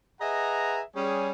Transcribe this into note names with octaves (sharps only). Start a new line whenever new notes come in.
G#4 B4 D#5 E5 F#5 A#5
G3 C#4 G#4